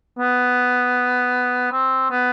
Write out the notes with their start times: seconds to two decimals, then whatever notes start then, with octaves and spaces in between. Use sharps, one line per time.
0.18 B3
1.72 C4
2.10 B3